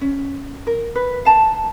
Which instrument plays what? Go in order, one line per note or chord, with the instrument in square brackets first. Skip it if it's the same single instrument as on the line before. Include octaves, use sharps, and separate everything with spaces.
[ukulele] C#4
A#4
B4
F5 A5 A#5